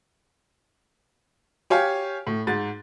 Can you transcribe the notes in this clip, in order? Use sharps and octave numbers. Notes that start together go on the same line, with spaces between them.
G4 C#5 F5 G#5
A2
G#2 A6